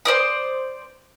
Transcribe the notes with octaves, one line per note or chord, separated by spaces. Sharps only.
C5 D5 D#6